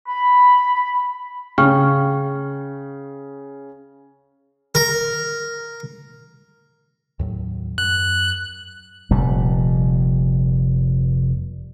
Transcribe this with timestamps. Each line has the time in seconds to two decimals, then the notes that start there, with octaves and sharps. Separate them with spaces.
0.09 B5
1.58 C#3 G5 C#6 F6
4.75 A#4
7.19 D#2 A2 F#3
7.78 F#2 F#6
9.11 F1 A#2 G3